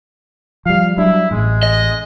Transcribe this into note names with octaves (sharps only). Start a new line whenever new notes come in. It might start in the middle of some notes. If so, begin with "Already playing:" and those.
F3 G3 F5
F#3 G3 D4 E4
A1 A2 G#3
D#5